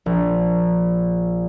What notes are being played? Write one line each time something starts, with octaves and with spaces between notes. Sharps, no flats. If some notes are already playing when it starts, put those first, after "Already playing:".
A#1